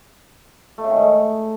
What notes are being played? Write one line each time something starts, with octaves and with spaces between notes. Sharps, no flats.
A3
C#3
D#3
G#2
A3